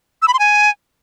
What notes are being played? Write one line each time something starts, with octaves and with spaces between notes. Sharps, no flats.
E6
B5
C6
G#5